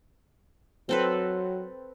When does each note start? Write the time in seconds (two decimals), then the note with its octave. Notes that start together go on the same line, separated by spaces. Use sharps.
0.89 F#3 C4 A4 B4